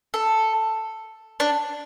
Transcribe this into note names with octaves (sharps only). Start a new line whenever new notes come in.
A4
D4